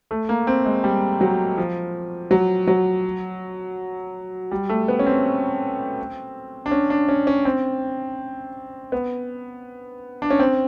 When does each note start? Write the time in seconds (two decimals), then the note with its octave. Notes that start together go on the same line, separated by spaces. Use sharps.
0.11 A3
0.29 A#3
0.47 C4
0.66 G#3
0.84 G3
1.21 F#3
1.58 F3
2.31 F#3
2.67 F#3
4.51 G3
4.69 A3
4.88 B3
4.99 C#4
5.06 C4
6.66 D4
6.71 C#4
6.90 D4
7.09 C#4
7.27 C#4
7.45 C4
8.92 B3
10.22 D4
10.30 C#4
10.39 C4